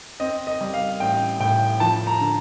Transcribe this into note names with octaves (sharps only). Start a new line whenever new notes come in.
C4 D#5
D#5
G3
F5
A1 G5
A2 G5
F3 A5
A#5
D3